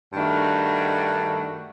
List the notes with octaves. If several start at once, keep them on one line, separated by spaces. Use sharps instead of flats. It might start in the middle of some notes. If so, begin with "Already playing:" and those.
G2 D#3 A3 D4 F#4